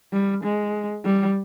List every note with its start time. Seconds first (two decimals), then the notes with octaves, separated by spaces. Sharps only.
0.13 G3
0.44 G#3
1.05 G3